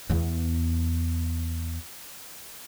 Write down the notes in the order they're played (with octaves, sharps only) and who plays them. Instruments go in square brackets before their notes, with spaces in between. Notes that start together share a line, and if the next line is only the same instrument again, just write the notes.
[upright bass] E2 B3